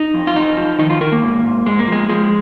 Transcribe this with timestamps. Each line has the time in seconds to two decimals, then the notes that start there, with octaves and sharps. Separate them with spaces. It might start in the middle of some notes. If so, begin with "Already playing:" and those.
Already playing: D#4
0.14 F2
0.27 F4
0.36 F2 D#4
0.57 F3
0.79 D#3 D#4
0.90 F4
1.01 D#3 A#4
1.12 A#3
1.22 G#2
1.44 G#2
1.66 G#2 G#3
1.79 A#3
1.88 F3 G#3
2.09 F3 G#3